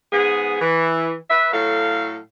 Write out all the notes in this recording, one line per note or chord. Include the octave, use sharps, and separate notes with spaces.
G#2 B3 G#4
E3
B4 E5
A2 F#3 A4 F5